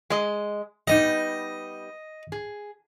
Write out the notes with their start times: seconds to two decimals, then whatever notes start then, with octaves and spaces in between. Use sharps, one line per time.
0.10 G#3 D#5
0.88 G3 B3 D#4 D#5
2.32 G#4